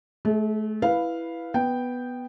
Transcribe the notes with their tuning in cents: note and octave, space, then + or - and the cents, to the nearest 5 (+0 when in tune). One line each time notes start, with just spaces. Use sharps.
A3 -30 G#4 +10
E4 +5 B4 +0 F5 +0
B3 +0 G5 +0